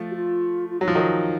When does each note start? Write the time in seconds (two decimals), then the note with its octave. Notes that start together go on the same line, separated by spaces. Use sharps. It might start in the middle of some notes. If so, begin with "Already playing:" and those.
Already playing: F3 A3
0.10 F#4
0.15 F4
0.69 F4
0.80 F#3 D#4
0.88 F3
0.95 D#3 F#3